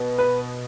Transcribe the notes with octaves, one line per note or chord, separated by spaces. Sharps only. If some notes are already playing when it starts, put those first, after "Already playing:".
Already playing: B2 B3
B4